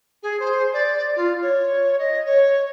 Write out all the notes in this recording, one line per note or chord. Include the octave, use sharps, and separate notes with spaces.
G#4
C5
D5
F4
C#5
D#5
C#5